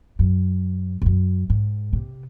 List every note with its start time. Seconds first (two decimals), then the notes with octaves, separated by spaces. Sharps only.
0.19 F#2
1.02 G#2
1.06 F#2
1.50 G#2
1.93 C3